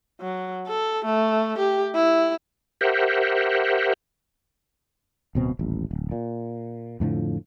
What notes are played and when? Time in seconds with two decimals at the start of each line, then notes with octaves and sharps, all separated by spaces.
0.21 F#3
0.67 A4
1.06 A3
1.59 G4
1.95 E4
2.81 G4 A#4 C5 E5 F#5
5.35 D1 B2 C4
5.59 D#1 A1
5.91 D1
6.11 A#2
7.00 F2 A2 D3 F3